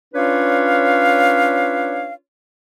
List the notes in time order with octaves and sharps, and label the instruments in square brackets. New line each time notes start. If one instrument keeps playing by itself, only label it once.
[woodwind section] C#4 D4 F4 B4 C#5 F5